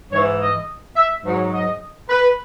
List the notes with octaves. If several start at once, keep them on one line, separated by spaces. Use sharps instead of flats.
G#2 E3 C#5
D#5
E5
G#2 F#3
D#5
B4